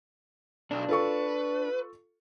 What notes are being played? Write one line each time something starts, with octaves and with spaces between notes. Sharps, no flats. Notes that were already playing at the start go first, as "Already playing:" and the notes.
B1 D4
F4 A4 B4 C#6